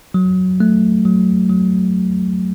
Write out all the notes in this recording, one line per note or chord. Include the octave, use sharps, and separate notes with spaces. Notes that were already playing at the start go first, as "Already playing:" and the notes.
F#3
A3
F#3
F#3